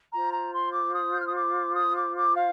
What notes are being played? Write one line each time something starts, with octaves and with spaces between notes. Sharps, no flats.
F4 C5 A#5
A#5
C6
D6
D#6
G6
F6
D#6
D6
D#6
D6
D6
F5